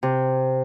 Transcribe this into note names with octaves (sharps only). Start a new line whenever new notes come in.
C3